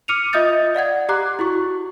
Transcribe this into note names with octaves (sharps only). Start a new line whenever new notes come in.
D6 F6 C#7 D#7 F7
F4 D#5 E5 D#6 G6 A6
D5 F5 F#5 G#6
G4 A#5 D6 F#6
E4 F#4 C#6